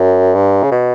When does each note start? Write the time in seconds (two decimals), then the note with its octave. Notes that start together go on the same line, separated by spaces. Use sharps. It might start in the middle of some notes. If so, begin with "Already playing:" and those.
Already playing: F#2
0.34 G2
0.63 C#3
0.71 B2